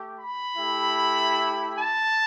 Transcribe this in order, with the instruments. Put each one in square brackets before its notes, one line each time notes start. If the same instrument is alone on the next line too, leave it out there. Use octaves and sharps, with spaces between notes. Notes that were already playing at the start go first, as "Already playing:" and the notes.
Already playing: [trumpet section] A3 G4
B5
A3 E4 G4
A5